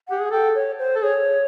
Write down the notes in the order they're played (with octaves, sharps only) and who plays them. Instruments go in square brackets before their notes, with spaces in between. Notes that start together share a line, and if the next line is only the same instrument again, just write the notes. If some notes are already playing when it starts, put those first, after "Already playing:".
[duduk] G4 [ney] F#5
[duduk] G#4
[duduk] A4 [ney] G5
[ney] C#5
C5
[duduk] A4
[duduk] G#4 [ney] C#5